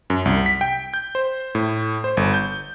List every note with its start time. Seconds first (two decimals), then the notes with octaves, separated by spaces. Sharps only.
0.10 F#2
0.25 C2
0.46 B6
0.61 G5
0.94 G6
1.15 C5
1.55 A2
2.04 C5
2.17 G1
2.34 G6